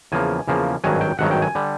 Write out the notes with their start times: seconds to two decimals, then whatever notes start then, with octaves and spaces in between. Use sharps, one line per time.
0.12 E2 C#3 F3 A#3 G#5
0.48 E2 C#3 F3 A#3
0.84 G#1 G2 D#3 F#3 G#5
1.01 G5
1.19 G#1 G2 D#3 F#3 F#5
1.31 G5
1.42 G#5
1.55 D3 G3